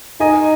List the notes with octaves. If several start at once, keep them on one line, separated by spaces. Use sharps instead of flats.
D#4 D#5 G#5